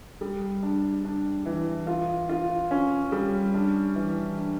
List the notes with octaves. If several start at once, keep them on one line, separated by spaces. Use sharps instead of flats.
G3
D4
D4
E3
F4
F4
C#4
G3
D4
E3
D4